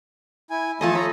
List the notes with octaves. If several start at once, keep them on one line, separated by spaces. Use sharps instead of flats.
E4 G#5
F3 A3 A4 D#5 G#5 A5
A4 C#5 A#5 B5